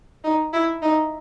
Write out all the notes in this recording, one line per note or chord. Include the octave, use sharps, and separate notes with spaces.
D#4
E4
D#4